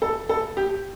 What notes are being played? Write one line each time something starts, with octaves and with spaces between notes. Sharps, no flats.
A4
A4
G4